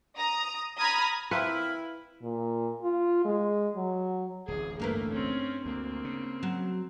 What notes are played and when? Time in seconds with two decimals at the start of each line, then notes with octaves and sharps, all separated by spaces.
0.18 A#5 D#6
0.79 A#5 B5 D#6 F6 G#6 A#6
1.31 F3 A#3 C4 E4 B4 F6
2.22 A#2
2.82 F4
3.25 G#3
3.76 F#3
4.48 D1 A1 G#4
4.80 G2 A3 A#3 A#4 B4
5.13 C4 C#4
5.66 D2 A#3 C4
6.04 C#3
6.43 F#3